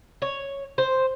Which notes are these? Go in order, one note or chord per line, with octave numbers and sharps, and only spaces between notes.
C#5
C5